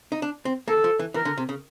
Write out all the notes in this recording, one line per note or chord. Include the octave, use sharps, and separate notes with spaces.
D#4
D4
C4
A#3 A4
F3
E3
E3 A#4
D3
C3
C#3